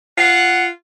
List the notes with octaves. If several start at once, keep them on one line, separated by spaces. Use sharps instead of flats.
F4 F#5